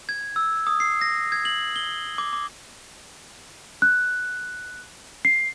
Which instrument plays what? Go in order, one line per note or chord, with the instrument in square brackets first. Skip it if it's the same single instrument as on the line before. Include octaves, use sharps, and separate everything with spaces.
[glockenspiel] G#6
E6
D#6
C7
A#6
G#6
F#7
G7
D6
D6
[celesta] F#6
C7